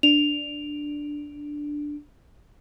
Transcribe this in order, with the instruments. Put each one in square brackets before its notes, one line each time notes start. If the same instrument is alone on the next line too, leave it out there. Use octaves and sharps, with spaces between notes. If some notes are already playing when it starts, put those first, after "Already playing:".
[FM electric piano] D4 [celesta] F7